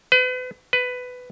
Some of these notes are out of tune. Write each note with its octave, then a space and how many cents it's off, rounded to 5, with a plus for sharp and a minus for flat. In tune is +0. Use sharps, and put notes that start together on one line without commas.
B4 +35
B4 +10